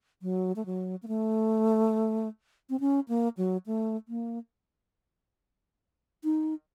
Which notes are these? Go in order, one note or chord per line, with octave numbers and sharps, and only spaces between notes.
F#3
A3
F#3
A#3
A3
C4
C#4
A#3
F#3
A3
A#3
D#4